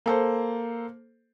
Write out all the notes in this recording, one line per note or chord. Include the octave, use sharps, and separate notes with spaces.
A#3 A4 C5